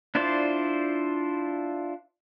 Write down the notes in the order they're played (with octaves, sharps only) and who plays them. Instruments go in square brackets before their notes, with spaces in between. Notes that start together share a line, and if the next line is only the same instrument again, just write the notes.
[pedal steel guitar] D4 E4 F4 C5 D5